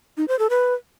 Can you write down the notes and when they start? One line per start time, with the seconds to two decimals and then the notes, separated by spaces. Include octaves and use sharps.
0.17 D#4
0.28 C5
0.39 A4
0.50 B4